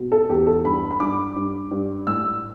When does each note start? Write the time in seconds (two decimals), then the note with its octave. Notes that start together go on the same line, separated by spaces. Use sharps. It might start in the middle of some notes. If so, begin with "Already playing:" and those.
Already playing: B2
0.12 A4
0.29 E2 G4
0.47 A4
0.65 G2 B5
0.91 B5
1.00 G2 D6
1.36 G2
1.71 G2
2.07 A2 E6